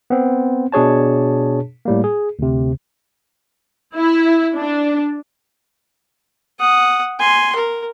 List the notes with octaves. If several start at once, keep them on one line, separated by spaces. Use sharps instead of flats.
B3 C4
B2 D4 G#4 C#5 A5
A2 G3 A#3
G#4
D2 C3
E4
D4
F#5 D#6
G#5 C6
A#4